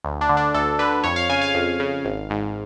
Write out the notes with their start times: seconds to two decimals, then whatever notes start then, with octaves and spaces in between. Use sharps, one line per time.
0.04 D2
0.21 D4
0.29 D3
0.37 D4
0.54 D2 A4
0.79 D3 B4
1.04 F2 C#5
1.16 F5
1.29 C#3 G#5
1.41 F5
1.55 F2
1.80 C#3
2.04 G#1
2.30 G#2